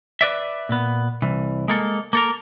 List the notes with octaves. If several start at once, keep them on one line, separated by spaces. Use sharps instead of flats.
B4 D5 E5
A#2 B3
C2 E3
G#3 A#3 A4
A#3 A4 A#4